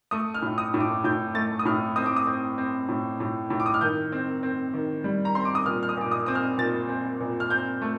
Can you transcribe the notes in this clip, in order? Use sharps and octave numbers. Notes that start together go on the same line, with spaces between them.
A3 D#6
F6
A2
D#6
A2
D6
A2 G6
A3 A6
D#6
A2 F6
C4 D#6
D6
D#6
C4
C4
A2
A2
A2
D6
D#6
F6
D#3 G6
C4
C4
D#3
G3
A#5
C4 C6
D6
D#6
A#2 F6
F6
D#6
A#2 D6
D#6
C4 D#6
F6
A#2 A6
C4
A#2
F6
C4 G6
A3